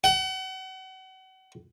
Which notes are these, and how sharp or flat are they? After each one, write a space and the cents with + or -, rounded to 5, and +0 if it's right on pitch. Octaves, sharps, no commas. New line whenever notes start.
F#5 +35